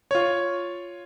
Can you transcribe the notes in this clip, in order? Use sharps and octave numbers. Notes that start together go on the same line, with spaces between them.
F4 C#5